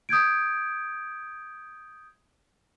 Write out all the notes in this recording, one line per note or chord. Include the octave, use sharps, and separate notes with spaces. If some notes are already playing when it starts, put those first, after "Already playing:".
D#6 G6 G#6 D7